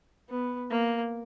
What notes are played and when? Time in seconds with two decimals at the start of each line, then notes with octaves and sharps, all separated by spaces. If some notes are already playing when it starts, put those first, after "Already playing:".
0.29 B3
0.71 A#3